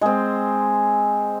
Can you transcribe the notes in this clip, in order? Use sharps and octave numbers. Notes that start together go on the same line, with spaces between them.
G#3 C4